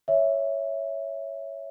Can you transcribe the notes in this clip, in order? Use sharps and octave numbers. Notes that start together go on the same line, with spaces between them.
C#5 E5